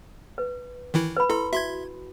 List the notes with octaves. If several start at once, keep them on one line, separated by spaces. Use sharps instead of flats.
B4
D#3 E3 E4
B4 B5
E4 A4 C6
F#4 E5 C6 G#6